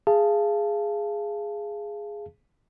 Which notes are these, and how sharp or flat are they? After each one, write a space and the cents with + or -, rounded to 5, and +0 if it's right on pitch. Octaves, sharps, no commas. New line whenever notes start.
G#4 +0 F5 -25 A5 +0